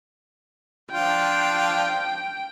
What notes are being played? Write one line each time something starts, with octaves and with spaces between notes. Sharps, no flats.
F3 D4 F4 G5